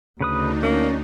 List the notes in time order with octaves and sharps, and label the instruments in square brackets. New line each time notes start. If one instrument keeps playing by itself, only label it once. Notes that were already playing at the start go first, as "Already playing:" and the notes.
[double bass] D2 [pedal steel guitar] C#3 B4 D#6 [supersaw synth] D4 D#4
[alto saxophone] A#3 [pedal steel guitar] C#4